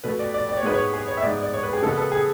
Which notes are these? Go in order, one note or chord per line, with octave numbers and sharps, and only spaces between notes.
B2 A3 B4
D5
D5
D5
C#5
G#2 G#3 B3 B4
C#5
G#4
C#5
E5
G#2 G#3 B3 D5
D5
C#5
B4
G#4
C#3 G#3 B3 A4
B4
A4
G#4